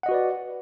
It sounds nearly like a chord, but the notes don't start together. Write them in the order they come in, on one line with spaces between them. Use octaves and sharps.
F#5 D#5 F#4 B4 D5